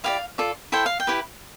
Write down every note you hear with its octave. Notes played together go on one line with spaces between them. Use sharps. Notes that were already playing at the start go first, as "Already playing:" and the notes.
E4 G4 D5 F5
F4 A4 D5
E4 A4 C5 G5
F5
G5
E4 G4 B4